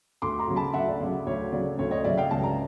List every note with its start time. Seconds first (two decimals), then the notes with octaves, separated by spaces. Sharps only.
0.22 D2 C6 D6
0.39 A#5 C6
0.47 C#3 F#3
0.56 A5 B5
0.74 D2 E5 F#5
0.88 D5
1.00 C#3 F#3
1.27 D2 C#5
1.52 C#3 F#3 D5
1.79 D2 C#5
1.91 C#5 D#5
2.04 C#3 F#3 D5 E5
2.17 F5 G5
2.31 C#2 A5
2.44 A#5